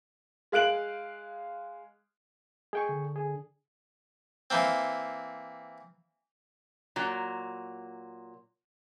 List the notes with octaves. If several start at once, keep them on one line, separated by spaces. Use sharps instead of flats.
G#3 F5 F#6 D7 F#7
G#3 G#4 G5 C#6
D3
G#4
E3 A#3 C4
A#2 F#3